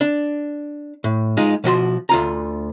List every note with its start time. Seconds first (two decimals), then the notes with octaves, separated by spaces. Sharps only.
0.01 D4
1.04 A2
1.37 G#3 D#4 F4
1.64 B2 F3 F#4 C6
2.09 D2 F4 A#5